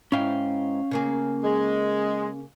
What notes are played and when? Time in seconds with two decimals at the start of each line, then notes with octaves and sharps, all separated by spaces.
0.12 G#2 C#4 E4 F5 G5
0.91 C#3 A#3 G#4
1.43 G#3